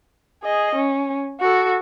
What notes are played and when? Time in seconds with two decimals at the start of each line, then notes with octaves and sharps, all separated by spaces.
0.43 G#4 D#5
0.75 C#4
1.40 F#4 A4